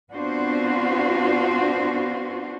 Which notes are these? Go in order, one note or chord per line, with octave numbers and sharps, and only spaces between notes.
B3 C4 D4 F4 F#4 C5